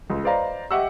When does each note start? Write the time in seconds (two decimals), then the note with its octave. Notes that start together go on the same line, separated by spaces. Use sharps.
0.10 C#2
0.24 B4 C5 D5 D#5 F5 A#5
0.71 G4 D#5 E5 F#5 C#6 E6